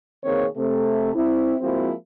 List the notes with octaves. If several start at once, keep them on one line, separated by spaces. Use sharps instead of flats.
B2 D#3 A#3 C4 G#4 C#5
C3 A3
C4 E4
F3 G#3 A#3 C4 E4 F#4